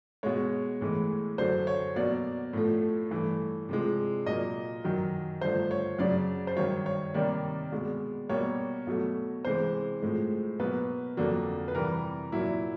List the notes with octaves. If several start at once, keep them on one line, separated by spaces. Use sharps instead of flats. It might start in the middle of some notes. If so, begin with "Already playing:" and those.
B2 G#3 C#5
A2 E3 G#3
F#2 D3 F#3 C5
C#5
B2 F#3 A#3 D5
A2 F3 A3
G2 E3 A3
C3 F3 G#3
A#2 F#3 A#3 D#5
F#2 D#3 F#3
G2 D3 F3 A3 C5
C#5
F#2 C#3 F#3 D5
C5
G2 D#3 F#3 C#5
C#5
C3 D#3 G3 A#3 D5
B2 G#3
B2 G3 A#3 C#5
B2 F#3 A3
C3 E3 G#3 C5
A2 F3 G#3
B2 F#3 A#3 B4
F2 D3 F#3 A#3
B4
C3 E3 G3 A#4
A#2 F#3 A#3 E4